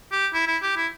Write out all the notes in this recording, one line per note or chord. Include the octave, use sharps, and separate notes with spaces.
G4
E4
E4
G4
E4